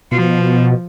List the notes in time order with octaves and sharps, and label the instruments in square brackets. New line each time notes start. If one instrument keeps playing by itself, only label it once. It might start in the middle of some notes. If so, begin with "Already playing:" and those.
[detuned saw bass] B2 [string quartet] F3